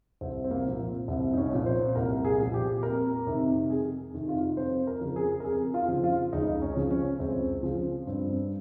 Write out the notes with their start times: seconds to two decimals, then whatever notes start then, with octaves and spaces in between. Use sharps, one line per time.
0.21 C2 C4
0.44 C4
0.51 A#3
0.65 A#2 F3
0.80 C4
1.08 C2 C4
1.33 D#4
1.37 C#4
1.53 A#2 F3
1.66 C5
1.96 C2 A#4
2.25 G#4
2.39 A#2 F3
2.54 G4
2.83 F2 A#4
3.27 C3 D#3
3.70 F2 G#4
4.14 C3 D#3
4.29 F4
4.57 F2 C5
4.87 A#4
5.01 C#3 F3
5.16 G#4
5.40 A#4
5.45 F2 G#4
5.74 F4
5.88 C#3 F3
6.04 F4
6.33 C#2 D#4
6.62 C#4
6.76 C#3 F3
6.91 C#4
7.19 C#2 C4
7.63 C#3 F3
8.07 G2 C4